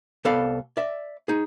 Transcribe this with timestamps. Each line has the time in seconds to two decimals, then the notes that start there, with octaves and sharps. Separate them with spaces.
0.25 C2 B3 A4 D5 F5 B5
0.77 D5 E5
1.28 D#4 G#4